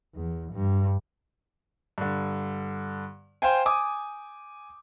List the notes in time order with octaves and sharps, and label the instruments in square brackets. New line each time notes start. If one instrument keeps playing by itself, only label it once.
[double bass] E2
G2
[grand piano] G2 D3
C5 F5 G5 G#5
G#5 D6 D#6